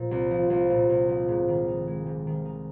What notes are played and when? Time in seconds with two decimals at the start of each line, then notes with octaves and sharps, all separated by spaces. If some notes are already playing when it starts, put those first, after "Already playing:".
Already playing: A#2 F3
0.11 C2
0.31 F3
0.50 C2
0.70 A#2
0.89 C2
1.09 F3
1.28 G#2
1.48 D#3
1.68 D#4
1.87 G#3
2.06 G#2
2.27 D#3
2.45 D#4